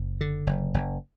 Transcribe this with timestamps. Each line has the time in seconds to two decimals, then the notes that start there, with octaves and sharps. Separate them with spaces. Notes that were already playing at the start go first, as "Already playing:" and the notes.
Already playing: F#1
0.21 D3
0.47 F#1
0.74 F#1